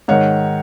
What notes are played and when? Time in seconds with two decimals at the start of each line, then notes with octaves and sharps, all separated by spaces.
0.08 G#2 D#3 C#5 F#5